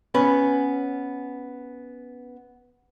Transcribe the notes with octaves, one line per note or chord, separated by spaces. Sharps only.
B3 C#4 B4